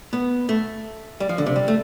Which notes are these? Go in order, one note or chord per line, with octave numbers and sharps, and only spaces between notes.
B3
A3
G3
F3
D3
C3
G3
A3